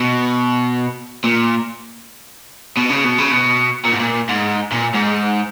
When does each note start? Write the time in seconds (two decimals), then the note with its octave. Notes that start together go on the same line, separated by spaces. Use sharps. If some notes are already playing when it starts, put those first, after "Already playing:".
Already playing: B2
1.24 A#2
2.77 B2
2.89 C#3
3.04 B2
3.18 C#3
3.32 B2
3.85 A#2
3.92 G#2
4.00 A#2
4.29 G#2
4.72 A#2
4.94 G#2